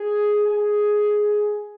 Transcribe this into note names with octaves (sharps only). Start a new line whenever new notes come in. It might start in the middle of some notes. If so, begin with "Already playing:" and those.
Already playing: G#4
G#4